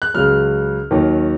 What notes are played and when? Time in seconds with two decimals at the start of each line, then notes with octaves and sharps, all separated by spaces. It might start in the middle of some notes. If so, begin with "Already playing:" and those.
0.02 F#6
0.14 C#2 C#3 F#3 F6
0.91 D#2 D#3 F#3